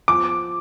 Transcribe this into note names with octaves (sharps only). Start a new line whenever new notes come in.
F3 D6